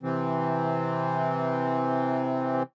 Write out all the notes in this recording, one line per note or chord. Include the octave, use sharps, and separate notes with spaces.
C3 E3 C4